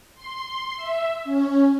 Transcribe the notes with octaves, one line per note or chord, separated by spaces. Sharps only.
C6
E5
C#4